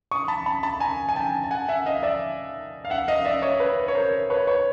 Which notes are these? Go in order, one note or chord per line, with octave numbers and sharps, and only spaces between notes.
C#6 D#6
A5 B5
A5 B5
A5 B5
G#5 A#5
G#5
G5 A5
A5
F#5 G#5
E5 F#5
D#5 F5
D5 E5
F5
E5 F#5
D#5 F5
D5 E5
C#5 D#5
B4
C#5
A#4 C5
B4 C#5
B4 C#5